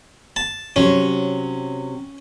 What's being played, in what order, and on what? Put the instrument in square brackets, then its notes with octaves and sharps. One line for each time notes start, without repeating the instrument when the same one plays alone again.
[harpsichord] A5
[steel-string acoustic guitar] C3 F#3 [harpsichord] C#4